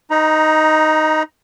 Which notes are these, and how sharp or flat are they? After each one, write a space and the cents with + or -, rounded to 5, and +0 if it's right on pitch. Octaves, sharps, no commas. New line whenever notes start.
D#4 +0 B4 +45 A#5 +25